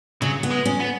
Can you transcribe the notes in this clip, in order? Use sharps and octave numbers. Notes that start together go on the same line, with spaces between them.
C#3 F#3
B3
G#3
C#4
B3